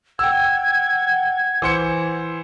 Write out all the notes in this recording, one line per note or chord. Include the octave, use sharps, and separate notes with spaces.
F#5 G5 E6 G#6
E3 C5 C#7